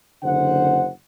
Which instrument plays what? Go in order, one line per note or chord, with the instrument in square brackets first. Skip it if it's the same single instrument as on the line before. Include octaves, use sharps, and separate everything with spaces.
[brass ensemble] F#1 D3 C5 F#5